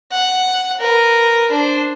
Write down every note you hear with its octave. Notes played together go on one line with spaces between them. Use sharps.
F#5
A#4 B4
D4 C5